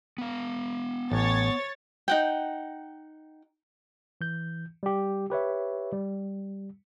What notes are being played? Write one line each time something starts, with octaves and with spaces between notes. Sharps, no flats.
B3 F5
A1 C#5 A6
D#4 F#5 G5
E3 G6
G3 G4
G4 B4 C#5 E5
G3